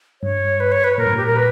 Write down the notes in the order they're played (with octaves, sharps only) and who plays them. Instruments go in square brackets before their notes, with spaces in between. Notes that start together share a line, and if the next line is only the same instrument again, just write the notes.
[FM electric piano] G2 [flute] C#5
[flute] B4
C#5
B4
[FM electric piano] A#2 [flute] A#4
[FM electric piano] G2
[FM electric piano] A#2 [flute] G4
[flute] A#4
B4